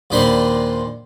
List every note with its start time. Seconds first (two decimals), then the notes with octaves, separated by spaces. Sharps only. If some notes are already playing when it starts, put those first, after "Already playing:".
0.10 D#2 A#2 D4 C5 B5 C6